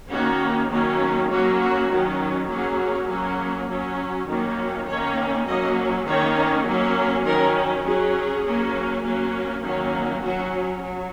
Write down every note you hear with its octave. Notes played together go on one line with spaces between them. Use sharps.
D#3 A#3 C#4 F#4
D#3 F#3 A#3 C#4
F#3 A#3 C#4 F#4
F#4
D#3 F#3 C#4
F#3 A#3 C#4 G#4
F#3 A#3 C#4
F#3 C#4
D#3 F#3 A#3 C#4
D#3 A#3 C#4 C#5
F#3 A#3 C#4 D#5
D#3 A#3 C#4 C#5
F#3 A#3 C#4
D#3 F#3 C#4 A#4
F#3 C#4 G#4
F#3 A#3 C#4
F#3 A#3 C#4
D#3 F#3 A#3 C#4
F#3 C#4 F#4
F#3